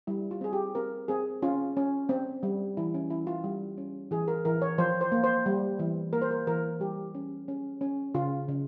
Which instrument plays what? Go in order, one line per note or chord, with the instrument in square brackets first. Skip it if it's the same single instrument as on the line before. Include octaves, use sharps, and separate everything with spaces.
[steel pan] G3 E4
F4
C4 G#4
G4
C4 A#4
C4 G#4
C#4 F4
C#4
C4
G3
E3 E4
C#4
E3 E4
F4
G3
C#4
E3 G#4
A#4
E3 A#4
C#5
F3 C5
C5
A#3
C5
G3
E3
A#3 A#4
C5
A#4
E3 A#4
G3 G4
C#4
C#4
C#4
C#3 F4
C#3